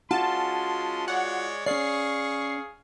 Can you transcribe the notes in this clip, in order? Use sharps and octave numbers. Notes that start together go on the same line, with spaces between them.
G#3 C#4 F4 F#4 A5 C6
G#3 C#5 D5 F#5
C#4 G#4 D5 F5 C#6 C7